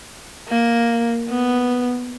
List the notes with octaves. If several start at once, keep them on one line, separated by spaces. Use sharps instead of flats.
A#3
B3